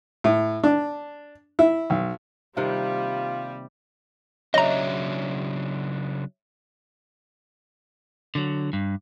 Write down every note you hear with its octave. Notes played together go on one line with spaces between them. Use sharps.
A2
D4
E4
B1
C3 D#3 G3 A#3 F4
C#3 F#3 D4 C#5 D#5 E5 A#5
D3 F#3
G2